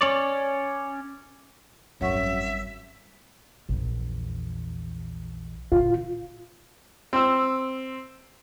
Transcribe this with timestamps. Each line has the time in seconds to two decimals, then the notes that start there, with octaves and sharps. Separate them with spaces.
0.01 C#4 C#5 D5
2.01 G#1 F#2 G3 C#5 E5 F#5 C#6
3.69 A#1 E2
5.72 A#2 D3 F4
7.13 C4 E6